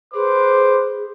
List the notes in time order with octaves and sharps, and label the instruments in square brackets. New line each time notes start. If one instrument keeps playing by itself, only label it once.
[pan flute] G#4 [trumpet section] B4 C5 D6